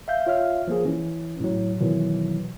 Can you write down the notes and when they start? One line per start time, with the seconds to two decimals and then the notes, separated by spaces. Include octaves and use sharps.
0.08 E5 F5 G6
0.27 F4 C#5 E5 F5 F6
0.68 F3 A#3 G#4
0.85 E3 C#4
1.40 A2 F#3
1.80 B2 D#3 E3 F#3